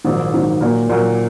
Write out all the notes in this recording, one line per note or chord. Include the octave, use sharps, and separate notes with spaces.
A#1 G#2 D#3 F#3
A#1 G#2 D#3 F#3
A#2 F#3 A#3
A#2 F#3 A#3